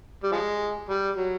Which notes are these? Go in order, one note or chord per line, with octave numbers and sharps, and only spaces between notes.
G3
F3 G#3
G3
F#3